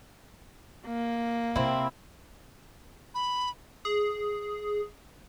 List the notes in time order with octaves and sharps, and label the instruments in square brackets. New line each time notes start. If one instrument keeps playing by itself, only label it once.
[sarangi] A#3
[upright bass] C3 [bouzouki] C4 E4
[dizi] B5
[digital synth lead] G#4